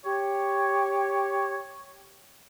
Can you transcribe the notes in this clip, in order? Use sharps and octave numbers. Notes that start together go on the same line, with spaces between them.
G4 C#5